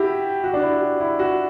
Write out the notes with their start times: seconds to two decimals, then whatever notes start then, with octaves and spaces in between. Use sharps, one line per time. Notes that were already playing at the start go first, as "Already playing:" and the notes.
Already playing: E4 F#4 G4
0.44 F#4
0.53 D4
0.62 E4
0.81 F#4
1.00 E4
1.19 F#4